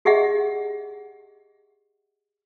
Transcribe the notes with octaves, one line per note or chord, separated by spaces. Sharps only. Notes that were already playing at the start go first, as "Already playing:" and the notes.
G4 G#4 D#5 E5 F#5